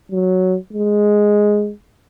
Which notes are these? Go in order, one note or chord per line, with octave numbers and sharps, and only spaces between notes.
F#3
G#3